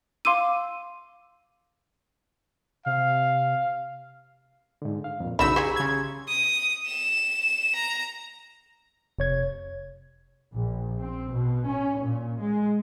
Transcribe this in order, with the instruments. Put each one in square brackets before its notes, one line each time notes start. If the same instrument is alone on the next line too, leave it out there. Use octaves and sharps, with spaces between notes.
[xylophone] F5 C6 D6 E6 D#7
[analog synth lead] C3 [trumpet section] F5
[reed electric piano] G#2 D3
F5
F2 A#2
[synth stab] B1 E6 [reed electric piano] E2 C#3 [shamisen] D#4 F#4 E5 [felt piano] B5
[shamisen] G4 G#4 G#5 [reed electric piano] A#5 C6 C#6
[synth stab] C#3 G#6
[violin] D#6
E7
A#5
[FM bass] F1 [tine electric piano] C3 C#5 G#6
[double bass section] A#1
C4
B2
C#4
A#2
G#3